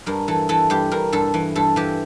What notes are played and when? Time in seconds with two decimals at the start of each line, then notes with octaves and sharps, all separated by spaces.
0.06 G2 A#4
0.28 E3 A4
0.49 E3 A4
0.70 G2 G4
0.91 G2 A#4
1.12 G2 A4
1.34 E3
1.55 G2 A4
1.76 E3 G4